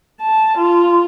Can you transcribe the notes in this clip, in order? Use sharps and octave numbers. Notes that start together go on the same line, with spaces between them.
A5
F4